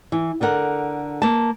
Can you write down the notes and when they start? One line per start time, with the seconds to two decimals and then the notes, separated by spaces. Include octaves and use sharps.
0.12 E3
0.41 D3 A4 A#4 F#5
1.22 A#3 A5